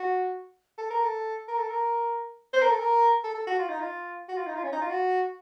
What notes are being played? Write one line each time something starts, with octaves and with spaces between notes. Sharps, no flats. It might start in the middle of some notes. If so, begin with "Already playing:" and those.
Already playing: F#4
A4
A#4
A4
A#4
A4
A#4
C5
A#4
A4
A#4
A4
A4
F#4
F4
D#4
F4
F#4
F4
D#4
F4
C#4
D#4
F4
F#4